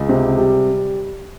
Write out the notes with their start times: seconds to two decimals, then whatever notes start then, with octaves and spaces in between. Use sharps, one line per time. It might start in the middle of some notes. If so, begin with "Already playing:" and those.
Already playing: C#2
0.09 C3
0.38 G3